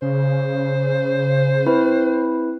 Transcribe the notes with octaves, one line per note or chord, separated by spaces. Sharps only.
C#3 C5
C4 E4 B4